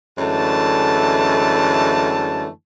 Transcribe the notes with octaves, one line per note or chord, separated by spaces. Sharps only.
F#2 D3 E3 G#3 A3 A5